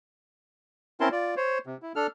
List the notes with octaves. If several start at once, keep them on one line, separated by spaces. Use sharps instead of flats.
C4 C#4 E4 A#4 A5 C6
F4 D5
C5 C#5
C3
E4
D4 A4 F6